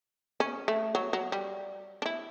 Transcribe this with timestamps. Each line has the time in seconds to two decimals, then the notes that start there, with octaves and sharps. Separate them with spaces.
0.40 C#4
0.68 A3
0.95 F#3
1.13 F#3
1.32 G3
2.02 D4
2.06 E4